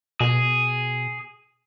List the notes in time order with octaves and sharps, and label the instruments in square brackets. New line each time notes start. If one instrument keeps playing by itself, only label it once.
[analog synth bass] B2 [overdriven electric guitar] G#4